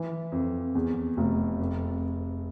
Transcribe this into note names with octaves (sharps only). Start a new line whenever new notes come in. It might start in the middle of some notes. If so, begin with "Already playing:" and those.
Already playing: E3
F2
E2
F1
F2